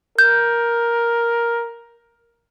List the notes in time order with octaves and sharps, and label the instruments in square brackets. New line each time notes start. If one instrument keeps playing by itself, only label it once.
[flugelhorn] A#4 [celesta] G6